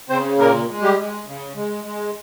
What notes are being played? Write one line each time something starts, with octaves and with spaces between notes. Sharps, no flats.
C#3 C4 C5
A#2 A#3 A#4
G#3
G3 G4
G#3
C#3
G#3
G#3